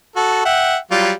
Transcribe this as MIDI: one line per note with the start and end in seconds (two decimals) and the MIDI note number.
0.16 0.44 66
0.16 0.44 69
0.16 0.44 81
0.45 0.77 76
0.45 0.77 78
0.45 0.77 79
0.91 1.12 54
0.91 1.12 55
0.91 1.12 65